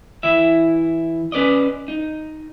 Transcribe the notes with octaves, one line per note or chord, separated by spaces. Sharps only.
E3 E4 E5
C#4 B4 D5 D#5
D#4